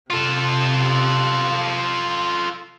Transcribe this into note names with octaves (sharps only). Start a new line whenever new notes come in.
C3 F4 A4